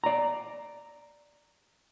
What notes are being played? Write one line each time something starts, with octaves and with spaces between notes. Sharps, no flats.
D5 A#5